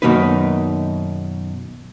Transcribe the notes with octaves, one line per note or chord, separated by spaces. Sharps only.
F#2 B2 D#3 A#3 D#4 B4